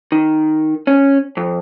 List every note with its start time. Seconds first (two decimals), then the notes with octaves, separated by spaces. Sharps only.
0.12 D#3
0.87 C#4
1.37 F2